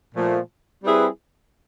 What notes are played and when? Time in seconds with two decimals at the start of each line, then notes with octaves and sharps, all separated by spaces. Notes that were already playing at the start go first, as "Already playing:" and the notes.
0.14 A#2 F3 A3
0.83 G3 C4 E4 G#4 B4